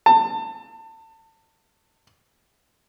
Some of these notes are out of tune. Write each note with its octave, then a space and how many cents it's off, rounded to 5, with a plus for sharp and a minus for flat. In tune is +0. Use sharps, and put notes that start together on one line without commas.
A5 +30